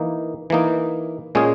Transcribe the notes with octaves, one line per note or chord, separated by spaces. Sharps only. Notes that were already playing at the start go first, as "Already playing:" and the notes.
Already playing: E3 A#3 D#4
E3 A#3 D#4
A#2 G#3 C#4 G#4